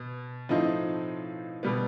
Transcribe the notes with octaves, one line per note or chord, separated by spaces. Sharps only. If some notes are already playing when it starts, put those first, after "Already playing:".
Already playing: B2
A2 F3 A3 C4 D#4
B2 G3 B3